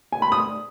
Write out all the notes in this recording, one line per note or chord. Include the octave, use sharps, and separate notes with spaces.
G#5
B5
D#6